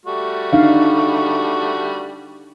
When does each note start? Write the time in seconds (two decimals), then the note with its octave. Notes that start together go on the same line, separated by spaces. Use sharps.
0.06 G3 A3 F#4
0.53 D4 D#4 F5